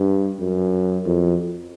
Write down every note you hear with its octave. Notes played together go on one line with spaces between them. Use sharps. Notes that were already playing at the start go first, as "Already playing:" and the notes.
Already playing: G2
F#2
F2